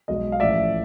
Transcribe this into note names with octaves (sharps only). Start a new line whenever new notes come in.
B1 B2 G#3 D#5
F5
A1 A2 F3 D5 E5